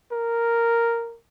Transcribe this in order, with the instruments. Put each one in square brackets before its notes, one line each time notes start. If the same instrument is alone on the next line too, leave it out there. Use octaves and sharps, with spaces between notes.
[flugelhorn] A#4